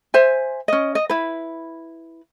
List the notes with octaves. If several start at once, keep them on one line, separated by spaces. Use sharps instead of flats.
C5 E5 G#5
C#4 D#5
D#5
E4 B4